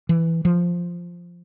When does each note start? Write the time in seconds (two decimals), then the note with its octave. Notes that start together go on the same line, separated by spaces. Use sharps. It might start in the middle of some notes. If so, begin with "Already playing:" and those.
0.09 E3
0.45 F3